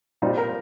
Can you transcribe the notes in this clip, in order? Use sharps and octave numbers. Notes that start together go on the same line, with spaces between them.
A#2 G3 C4 D#4 F4
A#4